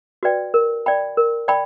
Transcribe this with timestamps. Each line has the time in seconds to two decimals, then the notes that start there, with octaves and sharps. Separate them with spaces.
0.23 F#4 B4 D5 G5
0.54 A#4
0.86 D5 G5 B5
1.17 A#4
1.48 D5 G5 B5